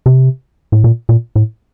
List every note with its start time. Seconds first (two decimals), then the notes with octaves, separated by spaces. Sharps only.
0.06 C3
0.72 A2
0.84 A#2
1.09 A#2
1.36 A2